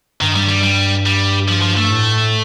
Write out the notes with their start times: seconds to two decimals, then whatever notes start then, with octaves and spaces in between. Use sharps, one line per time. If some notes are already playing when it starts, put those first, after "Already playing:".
0.21 G2 D#3
0.36 G3
0.49 G3
0.63 G3
1.06 G3
1.48 F3
1.62 F3
1.77 A3
1.91 A2